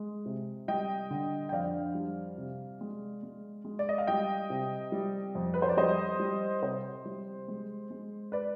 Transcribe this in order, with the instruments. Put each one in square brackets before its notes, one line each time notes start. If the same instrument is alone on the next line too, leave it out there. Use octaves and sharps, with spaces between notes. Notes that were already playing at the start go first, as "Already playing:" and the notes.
Already playing: [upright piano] G#3
C3
G3 D#5 G5
D3
G5
F2 D5 F5
G3
C3
G#3
G#3
G#3
D5
D#5
F5
G3 D#5 G5
C3
G3
F2
B4
C5
D5
G3 C5 D#5
G3
C3 C5
G3
G#3
G#3
B4 D5